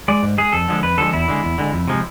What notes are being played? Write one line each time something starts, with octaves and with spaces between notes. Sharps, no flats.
G#3 D5
G#2
G#3 G#4
F2 A4
D3 F3 G#3
F2 B4
D3 F3 G#3 A4
E2 E4
D3 G#3
E2
D3 G#3
F2
C3 F3 G#3